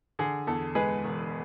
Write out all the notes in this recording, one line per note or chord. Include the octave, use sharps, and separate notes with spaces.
D3 G#4
E2 A4
G#3 G#4 B4
E1